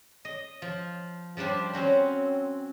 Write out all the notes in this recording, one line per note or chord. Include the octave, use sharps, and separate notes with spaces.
D#5
F3
F3 G3 D4 G4 C5
C4 C#4 F#4 C5